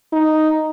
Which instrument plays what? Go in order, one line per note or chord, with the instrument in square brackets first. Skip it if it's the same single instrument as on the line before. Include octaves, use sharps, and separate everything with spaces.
[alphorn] D#4